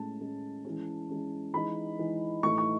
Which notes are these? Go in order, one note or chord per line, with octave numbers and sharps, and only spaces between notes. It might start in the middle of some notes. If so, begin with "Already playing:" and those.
Already playing: A2 G#3 C#4 A5
A2 G#3 C#4
E3 G#3 C#4
E3 G#3 C#4
E3 G#3 D#4 B5
E3 G#3 D#4
A2 E3 A3 D#4 C#6
C#6